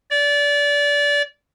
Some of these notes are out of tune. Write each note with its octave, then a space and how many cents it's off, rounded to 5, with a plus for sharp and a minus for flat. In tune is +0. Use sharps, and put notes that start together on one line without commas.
D5 -25